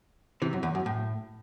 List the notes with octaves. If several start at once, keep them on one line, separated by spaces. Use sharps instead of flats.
C3 E3
F#2
E2
F#2
A2